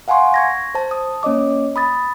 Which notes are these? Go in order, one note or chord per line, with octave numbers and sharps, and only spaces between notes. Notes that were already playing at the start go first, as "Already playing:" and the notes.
F5 F#5 G#5 A#5 C6 C#6
C#6 G#6 A#6
C5 A5
D#6
A#3 C#4 C#5 D#5 D6
B5 D#6 A6